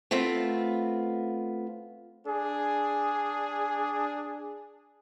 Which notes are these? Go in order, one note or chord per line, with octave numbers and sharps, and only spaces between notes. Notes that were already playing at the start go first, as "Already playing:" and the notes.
A3 B3 C4 F4
D4 G#4